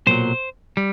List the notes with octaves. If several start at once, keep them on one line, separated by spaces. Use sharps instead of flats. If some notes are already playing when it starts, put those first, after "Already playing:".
B1 A#2 F#3 C5
G3